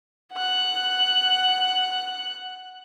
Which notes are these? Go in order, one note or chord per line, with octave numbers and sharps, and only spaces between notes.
F#5 F#6